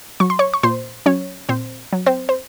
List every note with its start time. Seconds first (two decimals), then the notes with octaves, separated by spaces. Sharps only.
0.20 F#3 C#6
0.30 C6
0.39 C#5 C#6
0.54 C#6
0.63 A#2 C5 C6
1.06 F#3 C#4 C#5
1.49 A#2 C4 C5
1.93 F#3
2.06 C4 C5
2.29 C5